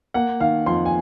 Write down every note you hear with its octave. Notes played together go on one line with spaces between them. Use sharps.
A#3 F#5
D#3 F5
F2 C6
G#5